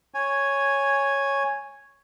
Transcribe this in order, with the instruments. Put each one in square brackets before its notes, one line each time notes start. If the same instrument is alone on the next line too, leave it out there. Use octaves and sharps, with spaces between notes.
[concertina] C#5 G#5